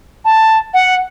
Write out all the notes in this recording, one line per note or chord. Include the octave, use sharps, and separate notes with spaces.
A5
F#5